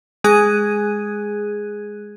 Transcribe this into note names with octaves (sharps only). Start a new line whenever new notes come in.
G#3 G#4 F#6 G#6 D#7